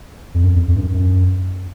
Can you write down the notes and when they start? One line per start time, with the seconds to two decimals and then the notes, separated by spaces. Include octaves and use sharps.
0.34 F2
0.44 F#2
0.56 F2
0.68 F2
0.76 G2
0.81 F#2
0.94 F#2